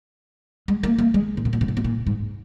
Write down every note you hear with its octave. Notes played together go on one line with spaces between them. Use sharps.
G#3
A#3
A#3
G#3
A#2
B2
A#2
B2
A#2
B2
A#2
G#2